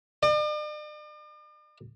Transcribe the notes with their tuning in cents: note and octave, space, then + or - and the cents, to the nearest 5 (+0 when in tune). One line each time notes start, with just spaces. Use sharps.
D5 +45